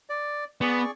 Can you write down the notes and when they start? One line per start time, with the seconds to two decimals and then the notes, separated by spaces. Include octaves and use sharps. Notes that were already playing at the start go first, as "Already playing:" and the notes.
0.10 D5
0.61 B3 G#4 D5 C#6